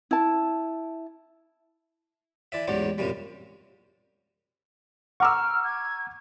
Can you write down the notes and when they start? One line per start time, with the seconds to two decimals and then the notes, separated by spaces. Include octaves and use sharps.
0.11 E4 A5
2.52 E3 D5 E5
2.68 A1 E2 G#2 F#3 G4 D5
2.98 A#1 F#2 C3 G3
5.20 F#5 A#5 C#6 D6 E6 F6
5.64 G#6